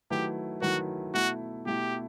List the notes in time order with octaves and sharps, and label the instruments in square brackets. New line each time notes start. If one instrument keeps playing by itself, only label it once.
[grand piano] D#3 F#3 A3 E4 B4 [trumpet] G4
[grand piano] D#3 F#3 A3 E4 B4 [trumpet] F#4
[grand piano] B2 A3 E4 [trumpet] F#4
[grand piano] B2 A3 E4 [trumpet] G4